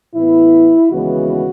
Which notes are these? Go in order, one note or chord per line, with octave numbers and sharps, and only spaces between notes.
A2 E3 B3 E4
D#2 C#3 E3 G#3 B3 F#4